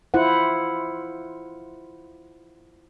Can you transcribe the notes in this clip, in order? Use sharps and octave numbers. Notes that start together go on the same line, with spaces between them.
E4 F4 C5 F#5